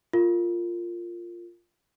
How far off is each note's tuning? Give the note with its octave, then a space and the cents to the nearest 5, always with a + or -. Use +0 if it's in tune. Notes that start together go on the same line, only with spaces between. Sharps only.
F4 -5 A#4 -20